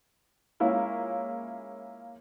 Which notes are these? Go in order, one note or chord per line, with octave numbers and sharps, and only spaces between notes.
G#3 A#3 C#4 E4 F4